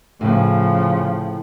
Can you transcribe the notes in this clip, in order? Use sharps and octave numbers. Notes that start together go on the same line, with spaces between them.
A2 C#3 F3